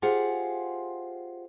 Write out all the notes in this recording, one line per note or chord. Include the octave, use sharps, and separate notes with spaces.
F4 G4 G#4 C5 F5 F#5